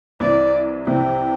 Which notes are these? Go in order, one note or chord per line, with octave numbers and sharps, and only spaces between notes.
C2 C3 E3 D5
C2 C3 E3 G5